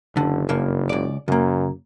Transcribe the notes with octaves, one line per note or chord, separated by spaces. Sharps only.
F#1 D3
G2 C#3 A#3
C#2 D5
F#2 C#3 A#3